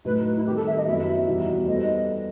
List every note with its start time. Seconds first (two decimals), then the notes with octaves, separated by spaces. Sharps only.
0.05 A2 F#3 A3 D#4 B4
0.25 B4
0.36 E4
0.46 D#3 G3 C4 G4
0.56 A4
0.66 E5
0.76 D#5
0.87 F#2 F#3 B3 E4 G4 E5
1.27 E2 B2 G3 D#4 F#4
1.67 G3 B3 D#4 A4 C5 D#5